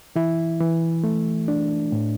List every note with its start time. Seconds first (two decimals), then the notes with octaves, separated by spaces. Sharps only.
0.16 E3 E4
0.60 E3
1.04 A3
1.48 D4
1.92 A2